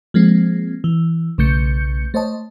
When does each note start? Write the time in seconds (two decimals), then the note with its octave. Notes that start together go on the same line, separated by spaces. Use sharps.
0.14 F3 G#3 A#3 C4
0.84 E3
1.38 B1 C#3 A3 G6 C#7
2.14 A3 C5 C#5 D#5 A5